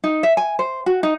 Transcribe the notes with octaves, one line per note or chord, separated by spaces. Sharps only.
D#4
E5
G#5
C5
F#4
D#4